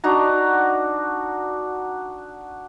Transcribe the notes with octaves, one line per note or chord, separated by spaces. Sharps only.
D4 D#4 F#4 A#5